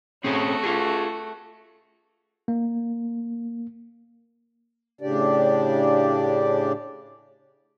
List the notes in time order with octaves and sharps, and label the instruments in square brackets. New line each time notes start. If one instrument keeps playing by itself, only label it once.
[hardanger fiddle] A3 F#4 [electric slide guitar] C4 C#4 G#4
[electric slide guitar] F4 G#4
[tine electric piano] A#3
[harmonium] A2 C#3 D4 G4 D5